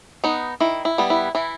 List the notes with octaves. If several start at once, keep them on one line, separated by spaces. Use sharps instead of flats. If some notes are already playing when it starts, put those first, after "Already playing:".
B3 D#4
D#3 E4
E4
G3 B3
E4
E3 E4